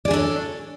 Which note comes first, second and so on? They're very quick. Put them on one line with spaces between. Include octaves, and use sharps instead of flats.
D5 G#4 D4 A4 C#5